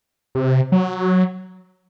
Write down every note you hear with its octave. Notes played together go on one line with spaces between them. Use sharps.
C3
F#3